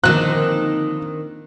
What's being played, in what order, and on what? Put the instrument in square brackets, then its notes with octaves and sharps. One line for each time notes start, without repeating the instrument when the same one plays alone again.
[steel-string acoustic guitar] D3 F3 A#3 [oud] D#3 C4 [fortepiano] F#6